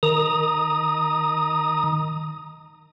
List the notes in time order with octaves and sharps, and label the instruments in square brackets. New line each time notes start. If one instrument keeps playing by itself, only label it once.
[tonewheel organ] D#3 A#5 D#6